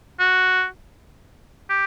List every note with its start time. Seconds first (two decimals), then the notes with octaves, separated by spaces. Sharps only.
0.20 F#4
1.70 G4